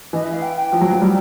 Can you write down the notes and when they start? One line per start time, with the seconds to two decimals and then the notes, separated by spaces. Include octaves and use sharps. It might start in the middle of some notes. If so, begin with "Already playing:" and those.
0.13 E3 D#5
0.23 E5
0.33 F5
0.42 G5
0.57 G5
0.73 F3
0.81 F#3
0.92 F#3
1.02 G3